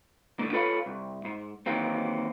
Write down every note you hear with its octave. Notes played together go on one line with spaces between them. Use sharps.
A2 D3 A#3
F4 A4 B4 C#5 E5 F5
C2
G#2
D#3 E3 F#3 A#3 C4